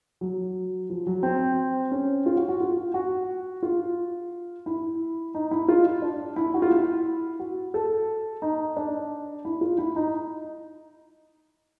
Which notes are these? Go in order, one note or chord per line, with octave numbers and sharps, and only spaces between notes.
F#3
F3
F#3
C4
C#4
F4
F#4
F#4
F4
F#4
F4
E4
D#4
E4
F4
D4
E4
F#4
F4
E4
F#4
A4
D#4
D4
E4
F4
E4
D#4